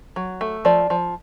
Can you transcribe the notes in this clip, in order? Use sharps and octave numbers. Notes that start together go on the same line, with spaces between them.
F#3
A3
F3 D5
F3